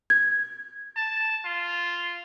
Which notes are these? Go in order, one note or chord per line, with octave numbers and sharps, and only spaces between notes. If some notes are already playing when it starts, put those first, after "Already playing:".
G#6
A5
F4